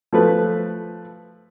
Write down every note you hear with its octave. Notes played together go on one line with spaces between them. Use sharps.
F3 A3 B4